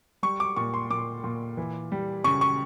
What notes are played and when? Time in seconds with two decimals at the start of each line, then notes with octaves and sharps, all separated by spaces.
0.23 G3 C#6
0.40 D6
0.56 A#2 C#6
0.74 C6
0.90 A#2 D6
1.24 A#2
1.57 E3
1.92 G3
2.24 C#3 C#6
2.41 C#6